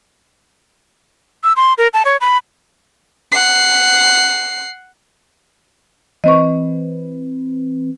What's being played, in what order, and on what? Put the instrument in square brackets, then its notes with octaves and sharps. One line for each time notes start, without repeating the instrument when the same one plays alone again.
[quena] E6
C6
A#4
A5
C#5
B5
[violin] F#5 C7
[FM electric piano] E3 C4 B4 [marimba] D#5 C#6